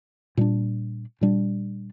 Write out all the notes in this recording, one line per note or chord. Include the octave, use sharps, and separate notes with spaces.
A#2 G3 D4
A#2 G3 D4